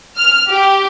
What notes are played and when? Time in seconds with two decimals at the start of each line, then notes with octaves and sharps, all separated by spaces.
0.17 F6
0.49 G4